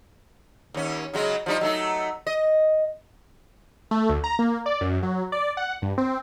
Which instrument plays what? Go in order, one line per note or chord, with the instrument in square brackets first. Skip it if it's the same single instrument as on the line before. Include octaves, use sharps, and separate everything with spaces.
[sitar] D#2 C#4
C#3 F#3 G#3
F3 G3 D#4
F#3 A3 D#4
D#5
[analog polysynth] A3
D2
A#5
A#3
D5
F#2
F#3
D5
F#5
G2
C4